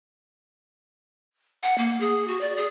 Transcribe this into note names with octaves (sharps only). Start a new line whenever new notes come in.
F#5
A#3
G#4
F#4
D5
G#4